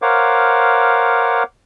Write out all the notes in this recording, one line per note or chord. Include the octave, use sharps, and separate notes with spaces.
A#4 C5 C#5 F5 F#5 D6